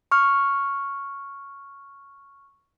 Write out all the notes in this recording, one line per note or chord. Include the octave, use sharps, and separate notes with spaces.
C#6 F6